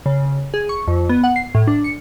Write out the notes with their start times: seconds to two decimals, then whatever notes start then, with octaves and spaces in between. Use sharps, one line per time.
0.06 C#3
0.54 G#4
0.69 C#6
0.88 F2
1.09 B3
1.24 F#5
1.36 C7
1.55 A2
1.67 D4
1.84 C#7